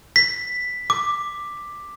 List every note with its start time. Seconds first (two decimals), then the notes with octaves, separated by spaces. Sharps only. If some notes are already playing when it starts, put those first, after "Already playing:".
0.16 B6
0.90 D6